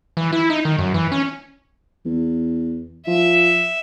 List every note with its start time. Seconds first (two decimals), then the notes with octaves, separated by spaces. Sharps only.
0.17 E3
0.33 E4
0.50 D#4
0.65 D#3
0.78 F#2
0.94 E3
1.12 C#4
2.05 E2
3.07 F3 E5